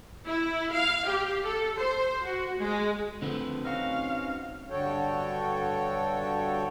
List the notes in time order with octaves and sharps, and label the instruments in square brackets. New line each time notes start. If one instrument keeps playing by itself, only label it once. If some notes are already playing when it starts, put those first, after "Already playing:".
[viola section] E4
F5
G4
A4
C5
F#4
G#3
[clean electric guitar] D3 F3 A3 [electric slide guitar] C4 B4
[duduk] C#4 [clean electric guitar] D#4 F#4 [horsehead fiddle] F5
[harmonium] G2 D3 F#4 A4 C#5 G5